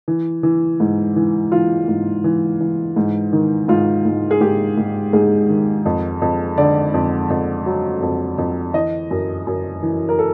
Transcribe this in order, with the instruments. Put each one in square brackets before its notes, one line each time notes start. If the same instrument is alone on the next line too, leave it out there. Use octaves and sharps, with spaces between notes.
[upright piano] E3
E3
G#2
E3
E3 F4
G#2
E3
E3
G#2
D#3
G#2 F4
G#2
G#4
G#2 G4
G#2
G#2 G#4
D#3
F2
F2
D3 D5
F2
F2
F#3
F2
F2
E3 D#5
F#2
F#2
E3
A#4
A4